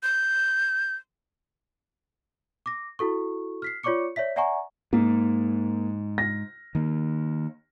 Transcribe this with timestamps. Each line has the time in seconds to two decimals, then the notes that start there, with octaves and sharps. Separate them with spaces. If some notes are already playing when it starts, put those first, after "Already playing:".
0.03 G6
2.66 D6 A#6
2.99 E4 F#4 A4 C#6
3.62 F6 B6 C7
3.83 F4 C#5 D5 C#6 D6 C#7
4.16 C#5 D5 E5 B6
4.36 D5 E5 F#5 G#5 A#5 C#6
4.93 G#2 A#3
6.18 A#6
6.75 D#3 A#3